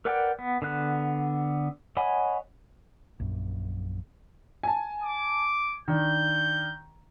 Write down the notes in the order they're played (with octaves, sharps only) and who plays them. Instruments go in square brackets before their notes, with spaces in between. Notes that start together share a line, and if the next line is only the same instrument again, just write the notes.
[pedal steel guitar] A#4 B4 D5 F#5 G5
B3
D3 B3 F#6
C#5 D#5 F#5 G#5 B5
[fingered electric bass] A#1 F#2
[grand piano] G#5 A5
[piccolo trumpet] D6
[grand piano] D#3 D4 [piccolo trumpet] G6